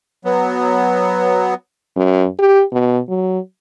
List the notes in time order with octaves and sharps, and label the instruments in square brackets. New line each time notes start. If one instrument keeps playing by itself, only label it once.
[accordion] F#3 B3
[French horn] F#2
G4
B2
F#3